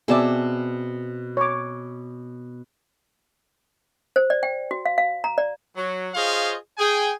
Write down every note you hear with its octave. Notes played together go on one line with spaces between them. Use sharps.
B2 C4 G#4 D5 E5 A5
C#5 D6
C5
D5
G5
F#4
F5
F5
A#5
D5
F#3
F4 G#4 C5 C#5 D#5 F5
G#4 G5 G#5